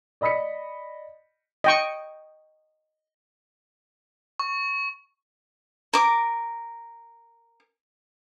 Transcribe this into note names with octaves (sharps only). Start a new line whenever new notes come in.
D5 D#5 B5 D#6 B6 C#7
D#5 G5 C#6
C#6
A#4 D6